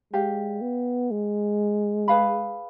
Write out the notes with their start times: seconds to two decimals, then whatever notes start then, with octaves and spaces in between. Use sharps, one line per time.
0.13 G#3 G4 D5 F5
0.62 B3
1.11 G#3
2.08 G#4 B4 F5 B5